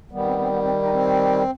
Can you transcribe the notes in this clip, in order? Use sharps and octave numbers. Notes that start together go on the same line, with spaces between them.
D#3 G3 B3
C4
C4
B3
C4
D#4
C4